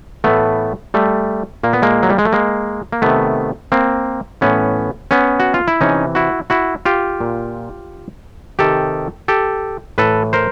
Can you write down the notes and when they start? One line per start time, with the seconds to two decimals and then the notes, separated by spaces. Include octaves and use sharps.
0.24 A2 E3 A3 B3
0.94 G3 A3
1.64 A#2 A#3
1.73 B3
1.82 G#3 A#3
2.03 F#3
2.10 G3
2.18 G#3
2.25 A3
2.32 G#3 A#3
2.92 A#3
3.02 C3 D#3 A3 B3
3.72 A#3 C4
4.41 A2 E3 B3 C#4
5.11 B3 C#4
5.40 F#4
5.54 F4
5.68 E4
5.81 C3 E3 C#4 D#4
6.15 E4 F#4
6.50 E4 F#4
6.85 F4 G4
7.20 A#2
8.59 C3 D#3 G4 A4
9.28 G4 A4
9.98 A2 E3 A4 B4
10.33 A#4 C5